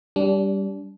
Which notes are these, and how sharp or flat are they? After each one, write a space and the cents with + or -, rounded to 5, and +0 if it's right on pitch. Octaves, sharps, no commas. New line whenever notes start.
G3 +0 D4 -30